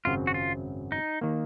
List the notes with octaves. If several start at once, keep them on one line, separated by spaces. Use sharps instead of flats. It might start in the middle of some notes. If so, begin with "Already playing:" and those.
G#1 F#2 C#3 F#3 C4 F4
F#4
F4
D#4
D#3 A#3